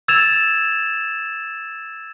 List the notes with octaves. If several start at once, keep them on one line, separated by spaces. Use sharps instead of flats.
E6 G#6 A6 E7 F7